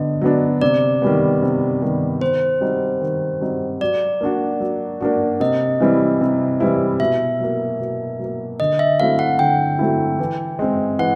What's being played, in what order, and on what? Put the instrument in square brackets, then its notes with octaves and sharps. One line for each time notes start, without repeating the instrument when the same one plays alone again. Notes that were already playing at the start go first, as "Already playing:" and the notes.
Already playing: [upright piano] D3 B3 [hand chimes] D#5
[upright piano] F#3 B3 D4
[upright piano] C3 [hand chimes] D5
[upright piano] D#3 G3 B3
C3
D#3 G3 B3
[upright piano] D#3 [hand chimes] C5
[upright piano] G3 C4 D#4 F#4
D#3
G3 C4 D#4 F#4
[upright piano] F#3 [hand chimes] D5
[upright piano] A#3 D4 F#4
F#3
A#3 D4 F#4
[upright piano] C3 [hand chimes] D#5
[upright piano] E3 G3 C4 E4
C3
E3 G3 C4 E4
[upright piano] B2 [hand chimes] E5
[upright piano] F#3 A#3
B2
F#3 A#3
[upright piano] D3 [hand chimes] D#5
[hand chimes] E5
[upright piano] F#3 A3 C4 E4 [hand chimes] F5
[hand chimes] F#5
[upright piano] D3 [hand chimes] G5
[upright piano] F#3 A3 C4 E4
E3
G#3 C4
[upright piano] E3 [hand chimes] F#5